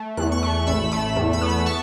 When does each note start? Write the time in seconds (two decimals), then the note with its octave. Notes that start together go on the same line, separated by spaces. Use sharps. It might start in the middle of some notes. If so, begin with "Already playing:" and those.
Already playing: A3
0.17 E2 F#6
0.32 C#6 F#6
0.43 A3
0.67 A1 B5 E6
0.92 A3 B5 E6
1.16 E2
1.33 B5 E6
1.41 B3
1.49 B5 E6
1.66 A5 C#6